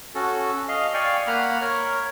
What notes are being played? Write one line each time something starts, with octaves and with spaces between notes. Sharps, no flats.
C#4 F#4 A4
D#5 F5
D5 F5 G5 G#5 C#6
A#3 F#5 A#5 B5 F6
A#4 C#5